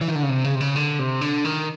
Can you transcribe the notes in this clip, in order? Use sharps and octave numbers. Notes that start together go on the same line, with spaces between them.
E3
D#3
D3
C#3
C3
C#3
C3
C#3
D3
C3
D3
D#3